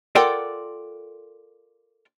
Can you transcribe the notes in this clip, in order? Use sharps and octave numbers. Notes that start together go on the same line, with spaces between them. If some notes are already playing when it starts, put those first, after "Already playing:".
F4 A4 A#4 D5 F#5 G5